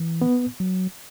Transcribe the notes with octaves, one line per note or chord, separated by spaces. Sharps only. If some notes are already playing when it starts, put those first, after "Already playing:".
Already playing: E3
B3
F#3